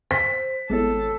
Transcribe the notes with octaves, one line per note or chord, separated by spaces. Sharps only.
C5 B6
G#1 G#3 B3 E4 A4 C#5